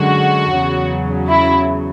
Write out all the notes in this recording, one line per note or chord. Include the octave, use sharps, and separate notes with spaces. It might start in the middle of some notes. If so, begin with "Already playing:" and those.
Already playing: F#2 D3 G#3 F#4
E2 C#3 F#3
E4